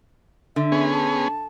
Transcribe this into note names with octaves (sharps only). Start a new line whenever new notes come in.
D3 E5
B3 C#4 G#4
A5